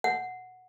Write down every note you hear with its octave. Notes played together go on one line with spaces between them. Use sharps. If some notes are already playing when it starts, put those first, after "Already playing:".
F#5